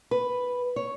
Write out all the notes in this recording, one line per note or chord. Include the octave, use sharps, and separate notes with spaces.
B4
C#5